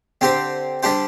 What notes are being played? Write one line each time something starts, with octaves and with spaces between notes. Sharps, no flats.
D3 C4 G4 C5
D3 G3 D4 G4 C5